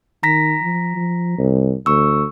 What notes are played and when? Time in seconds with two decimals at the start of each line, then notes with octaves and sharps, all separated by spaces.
0.23 D#3 A#5 A#6 B6
0.62 F3
0.96 F3
1.38 C2
1.86 D2 C#6 E6